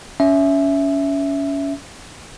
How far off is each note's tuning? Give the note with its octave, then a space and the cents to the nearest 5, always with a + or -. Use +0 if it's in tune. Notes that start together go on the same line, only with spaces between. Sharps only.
C#4 +25 E5 +0